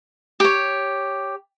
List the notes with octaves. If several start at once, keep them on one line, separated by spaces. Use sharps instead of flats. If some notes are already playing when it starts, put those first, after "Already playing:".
G4 C#5